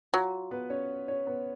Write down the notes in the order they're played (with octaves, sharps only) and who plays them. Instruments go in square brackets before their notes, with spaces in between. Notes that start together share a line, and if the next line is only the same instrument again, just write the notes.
[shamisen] F#3 [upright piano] F4
[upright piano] B3 B4
C#4 C#5
C#4 C#5
B3 B4